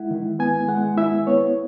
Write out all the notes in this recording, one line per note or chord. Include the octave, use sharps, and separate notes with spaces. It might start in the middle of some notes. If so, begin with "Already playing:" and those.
Already playing: G#3 E4 F#5
D#3
B3 G#5
G#3 F#5
E4 E5
B3 C#5